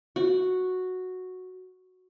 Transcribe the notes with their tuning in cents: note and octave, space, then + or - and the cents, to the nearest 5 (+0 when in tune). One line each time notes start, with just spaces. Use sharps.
F#4 -5